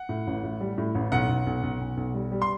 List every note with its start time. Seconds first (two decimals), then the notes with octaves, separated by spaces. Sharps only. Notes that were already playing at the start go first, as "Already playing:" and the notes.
Already playing: F#5
0.09 A2
0.27 A1
0.43 A2
0.61 G3
0.78 A2
0.95 A1
1.12 B1 F#5
1.29 B1
1.47 B1
1.63 B1
1.81 B1
1.97 B1
2.14 G3
2.32 G3
2.42 C6